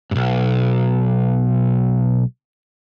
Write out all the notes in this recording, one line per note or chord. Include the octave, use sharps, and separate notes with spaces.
B1 G2